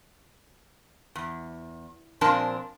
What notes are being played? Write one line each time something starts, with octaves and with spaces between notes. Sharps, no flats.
E2
A#2 F3 C4 D4 A#4 A5